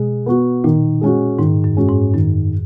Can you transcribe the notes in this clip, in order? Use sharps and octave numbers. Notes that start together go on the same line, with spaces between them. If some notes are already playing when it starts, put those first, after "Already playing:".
Already playing: B2 G#3
B3 F#4
A#2 D#3
G#3 C#4 F#4
G#2 D#3
F#2
G#3 C#4 F#4
G#2
F#2 D#3